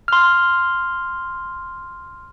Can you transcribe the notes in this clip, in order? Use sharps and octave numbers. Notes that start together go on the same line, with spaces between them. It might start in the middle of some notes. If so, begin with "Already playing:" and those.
C6 F6